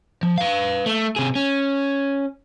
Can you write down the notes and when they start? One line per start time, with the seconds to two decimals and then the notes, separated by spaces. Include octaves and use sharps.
0.23 F3
0.38 B4 F5
0.86 A3
1.16 C3 G#4
1.36 C#4